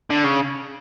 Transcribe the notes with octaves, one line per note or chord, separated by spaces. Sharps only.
D3
C#3